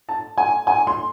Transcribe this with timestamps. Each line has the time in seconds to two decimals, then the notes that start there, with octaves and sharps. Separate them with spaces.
0.09 A5
0.38 G#5
0.67 G#5
0.87 C6